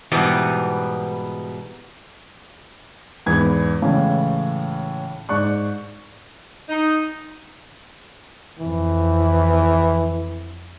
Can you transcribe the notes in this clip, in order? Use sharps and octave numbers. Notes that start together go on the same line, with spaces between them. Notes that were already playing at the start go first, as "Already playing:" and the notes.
G#2 B2 E3 G3 B3
E2 G#2 B4 G#6
A2 C#3 E3 G#3
G#2 D5 C#6 F#6
D#4
F2 E3